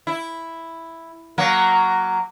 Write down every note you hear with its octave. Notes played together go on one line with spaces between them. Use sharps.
E4
F#3 A#3